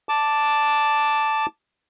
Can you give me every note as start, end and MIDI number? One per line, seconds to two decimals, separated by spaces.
0.09 1.46 81
0.09 1.46 86